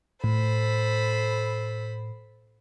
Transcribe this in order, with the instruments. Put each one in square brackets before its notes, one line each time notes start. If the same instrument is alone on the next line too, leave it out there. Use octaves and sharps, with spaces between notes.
[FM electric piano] A2 [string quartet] A4 C5 B5